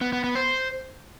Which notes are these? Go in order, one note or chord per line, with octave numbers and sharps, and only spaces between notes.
B3
B3
B3
C5